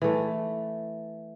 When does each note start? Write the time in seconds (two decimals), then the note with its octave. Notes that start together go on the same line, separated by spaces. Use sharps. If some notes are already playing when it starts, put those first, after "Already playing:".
0.02 E3 A3